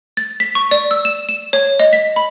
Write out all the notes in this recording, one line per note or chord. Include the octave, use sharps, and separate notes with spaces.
A6
B6
C#6
D5
E6
E7
E7
C#5
D#5
B6
B5